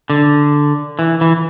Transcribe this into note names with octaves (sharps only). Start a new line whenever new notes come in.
D3
E3
E3